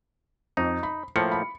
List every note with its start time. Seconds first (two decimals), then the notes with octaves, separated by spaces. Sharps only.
0.57 F2 D#4
0.83 B5
1.16 A2 F3 A#3 C#7
1.31 B5